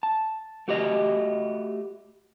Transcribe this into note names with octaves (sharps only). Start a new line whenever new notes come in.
A5
A3 F#4 G4 D#5